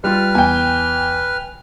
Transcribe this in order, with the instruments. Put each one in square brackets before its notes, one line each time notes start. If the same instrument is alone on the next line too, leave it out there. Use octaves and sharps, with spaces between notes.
[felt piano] G3 F4 [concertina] B4 F6
[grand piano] E2 [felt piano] G5 G#5